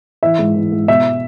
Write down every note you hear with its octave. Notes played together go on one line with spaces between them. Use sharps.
E3 E5
G#2
E3
G#2
B2 E5